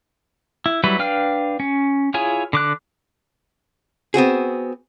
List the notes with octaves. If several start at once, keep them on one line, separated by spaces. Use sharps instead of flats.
E4
F#3 G3 E4 B4
D4 B4 F5 G5 F6
C#4
E4 F4 G#4 C#5 G#5
D3 D6 F#6
B3 C4 F#4 G#4